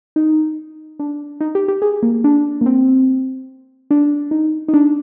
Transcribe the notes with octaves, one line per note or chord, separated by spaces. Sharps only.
D#4
D4
D#4
G4
G4
G#4
A#3
D4
A#3
C4
D4
D#4
D#4
D4